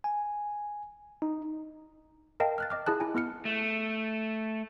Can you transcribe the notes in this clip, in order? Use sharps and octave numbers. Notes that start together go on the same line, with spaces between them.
G#5
D#4
A#4 D#5 F5 G5 A5
F6 F#6 A6
D#5 D6 F6
E4 G#4 A5 F#6
E4 G#5
B3 E4 F6 C#7
A3